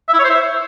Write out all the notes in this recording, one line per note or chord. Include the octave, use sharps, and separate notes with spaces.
E5
E4
C#5
C5
E5